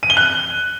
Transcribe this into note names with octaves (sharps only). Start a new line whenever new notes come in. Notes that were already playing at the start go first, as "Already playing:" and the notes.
D#7
G7
F#6